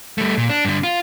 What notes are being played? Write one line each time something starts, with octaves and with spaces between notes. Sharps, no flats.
G3 A3
A#2
D4
G2 D3
F4